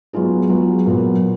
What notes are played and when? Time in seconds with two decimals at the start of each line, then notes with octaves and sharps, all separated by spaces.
0.13 F#3 B3 F4 G#4
0.49 F#3 B3 F4 G#4
0.86 A#2 F#3 B3